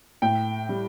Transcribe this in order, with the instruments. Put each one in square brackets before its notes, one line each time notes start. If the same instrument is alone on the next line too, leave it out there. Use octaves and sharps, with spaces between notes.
[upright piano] A2 G5
G3